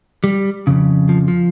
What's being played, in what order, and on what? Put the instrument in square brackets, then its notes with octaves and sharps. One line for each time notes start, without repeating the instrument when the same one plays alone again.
[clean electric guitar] G3
F2 C#3
F3
F3